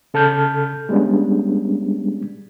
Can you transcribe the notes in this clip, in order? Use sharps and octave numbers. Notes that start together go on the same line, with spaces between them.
C#3 A4 A5 F6 G6
G3 G#3 B3 C#4 D4